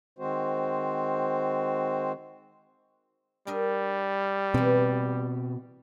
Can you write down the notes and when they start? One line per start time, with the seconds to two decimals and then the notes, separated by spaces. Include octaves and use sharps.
0.19 D#3 G#3 C4 F#4 C5
3.47 G3 D4 A#4 D#5
4.54 B2 E3 C4 B4